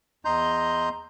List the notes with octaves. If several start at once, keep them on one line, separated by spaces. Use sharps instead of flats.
E2 D#5 A#5 C6 G6